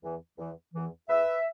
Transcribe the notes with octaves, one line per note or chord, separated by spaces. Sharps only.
E2 E3
E2 E3
E2 E3
E2 E3 B4 E5